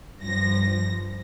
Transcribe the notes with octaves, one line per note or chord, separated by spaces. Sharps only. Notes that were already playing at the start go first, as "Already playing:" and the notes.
G2 F3 A#6